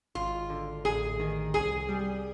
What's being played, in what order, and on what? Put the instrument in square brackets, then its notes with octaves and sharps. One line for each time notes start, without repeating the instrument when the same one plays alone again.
[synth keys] G#1 [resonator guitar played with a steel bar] F4
[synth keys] D3
[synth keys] A1 [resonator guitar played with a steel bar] G#4
[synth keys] D#3
[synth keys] C2 [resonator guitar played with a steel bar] G#4
[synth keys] G3